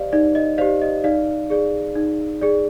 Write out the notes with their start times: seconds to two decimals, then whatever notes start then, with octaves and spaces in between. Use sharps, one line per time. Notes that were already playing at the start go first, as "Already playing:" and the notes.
Already playing: G4 C5 D5 D#5 F5
0.12 D#4 D5
0.35 D#5
0.58 G4 C5 D5 F5
0.82 D#5
1.04 D#4 D5 F5
1.50 G#4 D5
1.95 D#4
2.41 G#4 D5